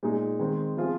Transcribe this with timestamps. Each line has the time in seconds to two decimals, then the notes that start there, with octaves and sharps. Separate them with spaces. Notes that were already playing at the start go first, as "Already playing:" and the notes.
0.03 A#2 G#3 D#4 G#4
0.39 D#3 G#3 C4
0.77 F3 C4 F4 G#4